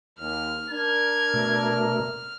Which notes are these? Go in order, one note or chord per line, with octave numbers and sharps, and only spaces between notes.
D#2 F6
D4 A#4 G#6
B2 A3